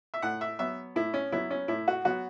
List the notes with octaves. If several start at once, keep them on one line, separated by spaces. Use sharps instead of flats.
E5
A2 F#5
E5
F#3 B3 E5
A2 E4
C#4
F#3 B3 E4
C#4
A2 E4
F#4
F#3 B3 F#4